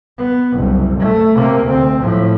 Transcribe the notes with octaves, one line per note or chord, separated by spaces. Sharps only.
B3
F#1 C2
A3
C3 A#3
D2 C4
A2 F3